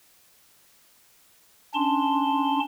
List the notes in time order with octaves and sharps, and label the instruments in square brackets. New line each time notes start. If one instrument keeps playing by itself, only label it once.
[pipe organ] C#4 D4 A5 C6